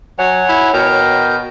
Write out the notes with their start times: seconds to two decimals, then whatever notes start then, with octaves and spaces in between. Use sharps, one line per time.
0.19 F#3 C#5 F#5 G#5
0.49 E4
0.74 B2 A#4 G5 A#5